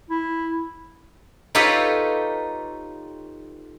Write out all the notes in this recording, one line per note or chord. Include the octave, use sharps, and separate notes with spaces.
E4
D#4 F4 G4 A4 B4 C#5